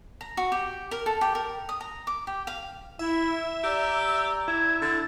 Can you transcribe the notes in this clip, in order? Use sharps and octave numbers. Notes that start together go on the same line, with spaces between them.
A#5
F#4
G4
A#4
A4
G4
A#4
D#6
A#5
D6
G4
F5
E4 E5
G4 D5 A#5 E6
E4 G#6
D3 A6